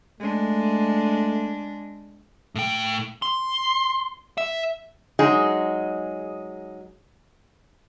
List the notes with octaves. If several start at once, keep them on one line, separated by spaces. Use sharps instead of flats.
G#3 A3 D4
A2 G5
C6
E5
F#3 G#3 D#4 G#4